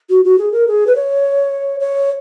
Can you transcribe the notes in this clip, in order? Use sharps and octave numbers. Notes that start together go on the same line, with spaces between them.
F#4
F#4
G#4
A#4
G#4
B4
C#5
C#5